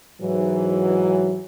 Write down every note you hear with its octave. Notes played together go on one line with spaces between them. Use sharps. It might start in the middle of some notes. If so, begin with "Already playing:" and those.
G#2 E3 F#3